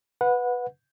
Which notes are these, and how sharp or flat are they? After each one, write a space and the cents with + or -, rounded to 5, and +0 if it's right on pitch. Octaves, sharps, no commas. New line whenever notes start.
B4 +0 F#5 -25